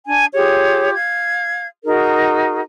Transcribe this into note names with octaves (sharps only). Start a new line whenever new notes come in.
D4 G#5
F4 G4 G#4 C#5
F5 G#6
D#4 F#4 G#4 A#4